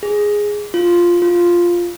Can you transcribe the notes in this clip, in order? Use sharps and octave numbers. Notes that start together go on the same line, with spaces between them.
G#4
F4
F4